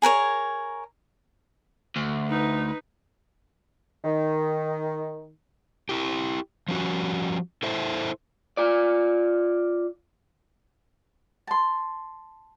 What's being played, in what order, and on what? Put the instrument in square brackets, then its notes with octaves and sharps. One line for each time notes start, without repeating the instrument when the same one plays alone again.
[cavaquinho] G#4 A#4 B4 C#5
[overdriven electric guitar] D2
[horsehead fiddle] D#4 B4
[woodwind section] D#3
[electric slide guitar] E4 G4
F3 G3 C#4 F#4
E4 A4 C5 E5
[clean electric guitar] F4 D5
[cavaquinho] A5 C6